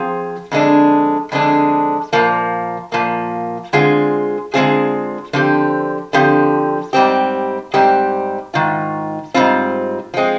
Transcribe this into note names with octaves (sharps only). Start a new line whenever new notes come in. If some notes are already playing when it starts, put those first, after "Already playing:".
Already playing: F3 C4 F4 G#4
F2 D3 G#3 D4
F2 D3 G#3 D4
A#2 F3 A#3
A#2 F3 A#3
D3 G#3 C4 F4 G#4
D3 G#3 C4 F4 G#4
D3 F3 C4 G4
D3 F3 C4 G4
G#2 G3 C4 G4
G#2 G3 C4 G4
G#2 D#3 F4
G#2 D#3 G3 C4 F4
F3 G#3 C4